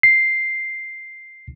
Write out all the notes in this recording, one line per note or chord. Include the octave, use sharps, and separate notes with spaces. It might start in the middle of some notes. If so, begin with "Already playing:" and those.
C7